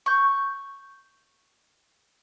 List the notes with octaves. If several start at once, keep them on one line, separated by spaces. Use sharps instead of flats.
C#6 G6